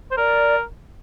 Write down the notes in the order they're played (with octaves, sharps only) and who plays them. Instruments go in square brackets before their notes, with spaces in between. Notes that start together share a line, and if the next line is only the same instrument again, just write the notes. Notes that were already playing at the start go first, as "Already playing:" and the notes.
[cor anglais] C5
[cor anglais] A#4 [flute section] D5